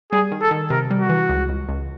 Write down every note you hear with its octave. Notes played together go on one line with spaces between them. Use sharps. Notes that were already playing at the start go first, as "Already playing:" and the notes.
G3 G#4
D#3
A4
D#3
C3 A#4
G3
F#4
E3
C#2
C#2
C#2